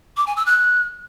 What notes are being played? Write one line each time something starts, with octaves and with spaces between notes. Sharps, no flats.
D6
G#5
E6
F#6